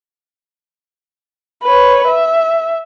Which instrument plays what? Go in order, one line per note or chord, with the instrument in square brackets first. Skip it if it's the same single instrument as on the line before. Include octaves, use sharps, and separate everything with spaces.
[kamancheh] B4 C#5
E5